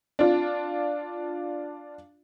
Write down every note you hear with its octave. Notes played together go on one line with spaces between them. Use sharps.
D4 F4